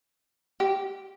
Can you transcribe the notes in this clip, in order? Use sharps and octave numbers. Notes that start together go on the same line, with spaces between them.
G4